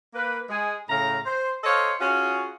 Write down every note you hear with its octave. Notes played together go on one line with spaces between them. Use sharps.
A#3 B4
G#3 G#4
A2 C#3 F5 A#5
C5
A4 C5 C#5 D#5 F5
C#4 F4 F#4 G#4